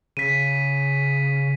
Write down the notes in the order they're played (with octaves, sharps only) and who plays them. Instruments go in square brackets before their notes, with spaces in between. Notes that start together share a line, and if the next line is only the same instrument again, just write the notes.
[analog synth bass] C#3 [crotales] B6 D#7